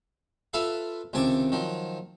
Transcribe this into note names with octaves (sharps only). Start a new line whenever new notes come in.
F4 A4 B4 E5 F5
C#2 C3 D#3 G#5 A5 D6
D#3 F3 F#3